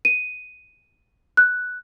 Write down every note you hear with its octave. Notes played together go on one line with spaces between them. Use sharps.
D#7
F#6